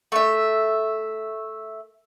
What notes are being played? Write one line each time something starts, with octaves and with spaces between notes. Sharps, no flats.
A3 E5